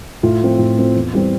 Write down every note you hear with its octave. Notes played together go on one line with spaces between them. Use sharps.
A2 F4
F3 C4
A2
F3 C4
E2
E3 G3 C4